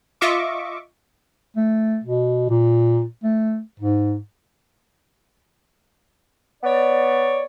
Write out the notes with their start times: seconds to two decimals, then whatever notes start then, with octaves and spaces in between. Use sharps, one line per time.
0.21 F4 D#5 E5 C#6 D6
1.56 A3
2.04 B2
2.49 A#2
3.23 A3
3.80 G#2
6.63 B3 C#5 D5